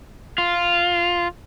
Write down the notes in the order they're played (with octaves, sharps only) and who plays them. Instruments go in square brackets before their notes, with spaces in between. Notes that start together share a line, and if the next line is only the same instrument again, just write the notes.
[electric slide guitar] F4